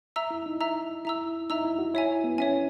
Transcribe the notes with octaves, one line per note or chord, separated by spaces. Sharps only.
E5 A#5 E6
E4
D#4
E5 A#5 E6
E4 E5 A#5 E6
D#4 E5 A#5 E6
E4
F#4
E4 C#5 E5 G#5
B3
C#4 C#5 E5 G#5